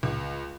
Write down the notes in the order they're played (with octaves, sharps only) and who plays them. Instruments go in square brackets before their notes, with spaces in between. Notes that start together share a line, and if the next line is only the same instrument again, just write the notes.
[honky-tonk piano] C#2